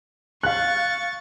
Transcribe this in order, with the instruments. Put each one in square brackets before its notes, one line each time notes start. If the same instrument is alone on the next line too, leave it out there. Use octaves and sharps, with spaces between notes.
[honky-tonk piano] F5 F#6 [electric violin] C#6 A6